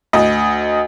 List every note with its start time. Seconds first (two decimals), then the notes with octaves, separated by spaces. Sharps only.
0.13 D2 D#5